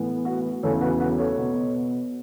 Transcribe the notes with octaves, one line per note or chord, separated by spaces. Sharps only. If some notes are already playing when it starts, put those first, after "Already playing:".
Already playing: A2 E3 B3
F#4 B4
E2 C#3 E3 A3 A4 C#5
F#4 B4
F#4 B4
A4 C#5
B2 B3